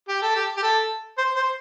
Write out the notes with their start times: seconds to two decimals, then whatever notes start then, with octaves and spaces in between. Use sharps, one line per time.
0.08 G4
0.22 A4
0.36 G4
0.57 G4
0.63 A4
1.18 C5
1.36 C5